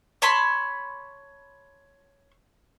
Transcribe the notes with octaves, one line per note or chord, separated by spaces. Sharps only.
C#5 A5 B5 C6